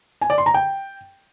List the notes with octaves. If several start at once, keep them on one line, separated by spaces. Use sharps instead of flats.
G#5
D5
C6
A#5
G5